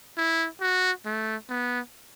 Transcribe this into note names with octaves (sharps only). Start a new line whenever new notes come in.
E4
F#4
A3
B3